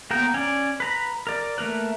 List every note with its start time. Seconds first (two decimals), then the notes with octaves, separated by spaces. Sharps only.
0.11 A#3 B3 A#4 G5
0.34 C#4 D5
0.80 B4 A#5 B5
1.27 A#4 D5
1.58 A3 A#3 A#4 B4